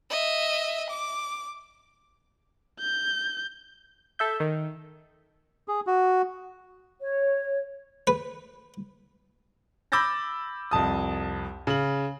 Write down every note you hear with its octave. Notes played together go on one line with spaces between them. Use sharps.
D#5 E5
D6
G6
A4 E5 G6
D#3
G#4
F#4
C#5
B4
B5 D6 E6 G6 A6 A#6
C2 F2 A5 D#6
C#3 F#7